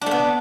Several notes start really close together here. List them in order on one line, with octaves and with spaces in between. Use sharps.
D4 A3 B3